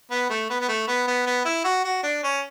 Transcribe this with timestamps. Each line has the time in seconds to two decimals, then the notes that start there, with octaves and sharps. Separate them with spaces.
0.11 B3
0.30 A3
0.50 B3
0.61 B3
0.68 A3
0.88 B3
1.08 B3
1.26 B3
1.45 E4
1.64 F#4
1.85 F#4
2.03 D4
2.24 C#4